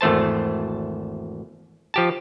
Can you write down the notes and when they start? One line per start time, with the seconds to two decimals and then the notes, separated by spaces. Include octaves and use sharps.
0.01 G#1 E2 A3 C5 A5
1.94 F3 G4 A5